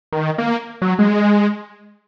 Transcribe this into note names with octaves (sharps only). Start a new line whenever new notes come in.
D#3
A#3
F#3
G#3